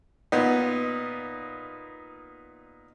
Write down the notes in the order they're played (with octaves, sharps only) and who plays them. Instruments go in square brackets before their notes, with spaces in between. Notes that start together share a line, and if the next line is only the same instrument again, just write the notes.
[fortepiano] A#2 B3 D#4